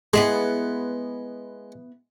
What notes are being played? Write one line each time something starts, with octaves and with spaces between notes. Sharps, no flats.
G#3 B3 E4 G#4